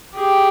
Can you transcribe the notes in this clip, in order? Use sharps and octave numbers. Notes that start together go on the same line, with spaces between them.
G4 G#4